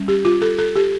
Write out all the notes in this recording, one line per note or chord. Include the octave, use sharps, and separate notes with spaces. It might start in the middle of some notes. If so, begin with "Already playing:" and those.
Already playing: G3 C#4
G4
F4
A4
A4
G4